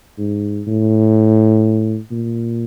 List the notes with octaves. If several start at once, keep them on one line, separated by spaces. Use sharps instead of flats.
G#2
A2
A#2